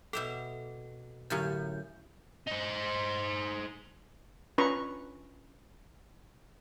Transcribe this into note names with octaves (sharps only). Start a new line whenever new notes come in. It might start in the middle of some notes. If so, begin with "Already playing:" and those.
B2 A4 E5 G5
F#2 A2 D3 C#4 G6
D#4 C5
C#4 D4 F4 B4 A#5 C#6